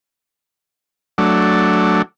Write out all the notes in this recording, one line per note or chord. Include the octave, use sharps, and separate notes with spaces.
F#3 A3 D4